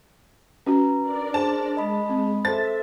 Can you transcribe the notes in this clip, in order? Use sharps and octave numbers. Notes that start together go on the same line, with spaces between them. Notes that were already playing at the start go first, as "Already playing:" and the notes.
C#4 F#4 B4 A#5
D4 A#4 D5
G#4 C5 A5
G#3 D#5 B5
C4
A4 C5 E5 A5 A6